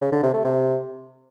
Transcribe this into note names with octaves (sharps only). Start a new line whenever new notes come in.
C#3
D3
C3
A3
C3